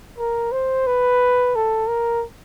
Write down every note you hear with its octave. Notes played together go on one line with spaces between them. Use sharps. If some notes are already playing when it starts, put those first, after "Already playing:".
A#4
C5
B4
A4
A#4